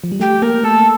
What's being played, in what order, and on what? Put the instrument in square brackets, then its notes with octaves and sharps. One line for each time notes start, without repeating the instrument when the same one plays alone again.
[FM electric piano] F3
G3
[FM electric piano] A3 [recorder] G4
[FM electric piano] A#3 [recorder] A#4
[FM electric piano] A3 [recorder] A4